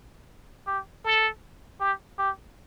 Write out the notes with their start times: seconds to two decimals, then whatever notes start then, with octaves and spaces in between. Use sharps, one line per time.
0.67 G4
1.04 A4
1.80 G4
2.19 G4